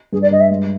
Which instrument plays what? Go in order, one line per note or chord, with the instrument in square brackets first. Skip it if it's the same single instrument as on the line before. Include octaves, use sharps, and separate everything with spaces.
[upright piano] G2 [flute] G#4
[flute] D5
[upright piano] G2 [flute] D#5
[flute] E5
[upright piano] G#3